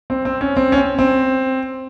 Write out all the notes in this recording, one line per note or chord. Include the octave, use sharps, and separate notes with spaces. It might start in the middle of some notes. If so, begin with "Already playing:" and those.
C4
C4
C#4
C4
C#4
C4
C4